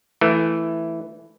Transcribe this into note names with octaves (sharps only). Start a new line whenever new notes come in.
E3 A3